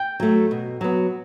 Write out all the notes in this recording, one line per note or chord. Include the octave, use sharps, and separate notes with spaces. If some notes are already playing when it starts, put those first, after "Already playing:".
Already playing: G5
F#3 A3
B2
F#3 B3